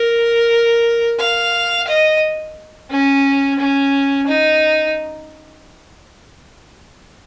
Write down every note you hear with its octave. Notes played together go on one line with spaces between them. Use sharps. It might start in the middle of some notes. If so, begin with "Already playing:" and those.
Already playing: A#4
F5
D#5
C#4
C#4
D#4